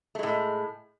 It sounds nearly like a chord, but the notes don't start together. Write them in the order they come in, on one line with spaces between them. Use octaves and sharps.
A3 G#3 A2